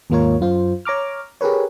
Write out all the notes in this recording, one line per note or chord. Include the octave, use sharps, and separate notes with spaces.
D#2 G#2 A#3 F4 A#4 C#5
F#2 F4 C5
C#5 A#5 D6 F6
G4 G#4 A#4 B4 C#5